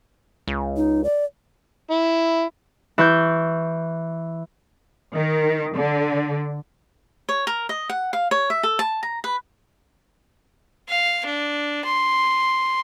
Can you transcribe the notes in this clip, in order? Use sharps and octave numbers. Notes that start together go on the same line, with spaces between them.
C#2
D#4
D5
E4
E3 C#6 G6
D#3
D3
C#5
A#4
D#5
F#5
F5
C#5
E5
A4
A5
A#5
B4
F5
D4
C6